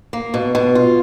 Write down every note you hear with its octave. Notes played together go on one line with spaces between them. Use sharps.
A#3
B2
B2
F4